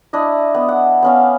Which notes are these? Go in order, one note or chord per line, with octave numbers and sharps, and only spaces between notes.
D4 E4 D#5
B3
F#5
B3 C#4 F5